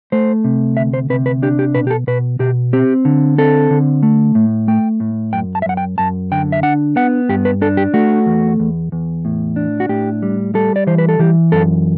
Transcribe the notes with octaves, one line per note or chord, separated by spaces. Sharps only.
A3 C5
C3
D2 E5
C5
C3 B4
B4
D4 G4
G4
B2 B4
G4
A4
B2 B4
B2 G4
C4 G4
D3
C4 A4
D3
A3
A2
A3 G5
A2
F#2 G5
A5
E5
F#2 F#5
G5
F#2 A5
D3 G5
E5
D4 F#5
B3 F#5
G2 G4
B4
D4 A4
G4
A3 F#4
E2
E2
E2
A2
D4
F#4
A2 G4
G3
G3 A4
D5
E3 C5
B4
A4
E3 G4
F#2 A4